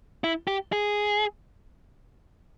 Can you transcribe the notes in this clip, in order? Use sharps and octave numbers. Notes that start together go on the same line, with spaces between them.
E4
G4
G#4